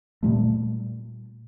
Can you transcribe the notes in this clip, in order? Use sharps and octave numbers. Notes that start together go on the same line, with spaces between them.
A#2 G3 A3